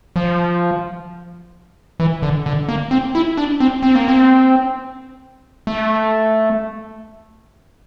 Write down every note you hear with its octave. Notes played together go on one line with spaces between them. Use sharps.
F3
E3
D3
D3
A#3
C4
E4
D4
C4
C4
A#3
C4
A3